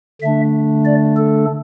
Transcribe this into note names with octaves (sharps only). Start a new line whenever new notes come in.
D3 A3 D4 E5
D5
A4